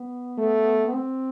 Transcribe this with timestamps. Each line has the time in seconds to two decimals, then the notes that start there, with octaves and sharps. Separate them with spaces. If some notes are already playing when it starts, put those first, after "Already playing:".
Already playing: B3
0.38 A3
0.87 B3
0.93 C4